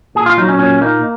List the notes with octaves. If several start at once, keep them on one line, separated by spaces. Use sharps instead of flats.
A#2 G#4
F4
F#3 D#4
C#4
A#2 C#4
A#3 D#4